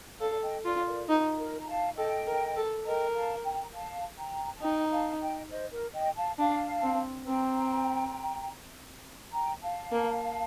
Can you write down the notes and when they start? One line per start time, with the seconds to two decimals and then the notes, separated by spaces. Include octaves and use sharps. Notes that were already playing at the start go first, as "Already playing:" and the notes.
0.21 A4 D5 F5
0.42 D#5 G5
0.65 F4 D5 F5
0.87 A#4 D5
1.09 D#4
1.39 A#4
1.60 A#5
1.68 F5 A5
1.97 A4 D#5 G5
2.27 A#4
2.56 A4
2.85 A#4 D#5 G5
3.14 F5 A5
3.44 G5 A#5
3.73 F5 A5
4.18 G5 A#5
4.55 A5
4.62 D#4 G5 A#5
4.91 F5 A5
5.21 D#5 G5
5.50 C5 D#5
5.72 A#4
5.94 D#5 G5
6.16 F5 A5
6.38 D4 F5 A5
6.83 C4
7.26 C4 G5 A#5
9.33 G5 A#5
9.62 F5 A5
9.92 A#3